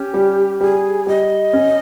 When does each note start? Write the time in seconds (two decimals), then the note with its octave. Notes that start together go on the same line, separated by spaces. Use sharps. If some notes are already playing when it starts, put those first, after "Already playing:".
Already playing: C#4 G4
0.14 G3
0.61 G3 G#4
1.07 G3 D#5
1.53 C#4